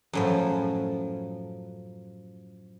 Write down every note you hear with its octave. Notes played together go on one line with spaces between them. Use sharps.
F#2 A2 F3